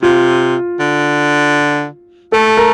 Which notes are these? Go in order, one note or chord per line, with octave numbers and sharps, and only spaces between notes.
C3 F4
D3
A3 A4
A#4